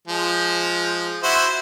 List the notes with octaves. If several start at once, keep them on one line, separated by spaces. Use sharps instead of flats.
F3 G#3
E4 F#4 C5